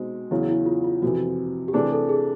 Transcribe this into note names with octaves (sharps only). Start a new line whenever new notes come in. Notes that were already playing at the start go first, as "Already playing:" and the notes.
Already playing: B2 G#3 C4 D#4 F#4
E2 C#3 F#3 E4
E4
F4
F4
F2 C3 E3 F#4
G4
C3 E3 A3 D4 G#4
A4
G#4